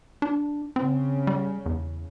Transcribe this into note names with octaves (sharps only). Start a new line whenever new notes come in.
D4
C#3 C4
G3
E2